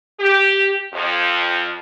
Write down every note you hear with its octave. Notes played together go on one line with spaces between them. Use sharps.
G4
F2